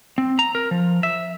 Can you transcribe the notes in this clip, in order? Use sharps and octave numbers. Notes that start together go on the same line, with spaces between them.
C4
A#5
A#4
F3
E5